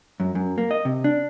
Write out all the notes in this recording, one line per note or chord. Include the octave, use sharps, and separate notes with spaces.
F#2
F#2
A#3
D#5
C3
D4